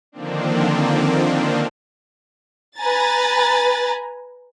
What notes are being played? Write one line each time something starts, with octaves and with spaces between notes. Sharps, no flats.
D3 D#3 F3 A#3 C4 D4
B4 G#5 A#5 A6